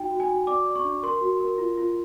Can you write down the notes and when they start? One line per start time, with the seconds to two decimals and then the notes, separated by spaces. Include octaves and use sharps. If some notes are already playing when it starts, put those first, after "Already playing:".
Already playing: D#4 F#4 G5
0.11 F#4
0.20 G#5
0.29 F#4
0.47 D5 D6
0.66 D5
0.75 C#6
0.84 D4
1.03 A#4 C6
1.21 F#4
1.40 A#4
1.58 F4
1.77 F4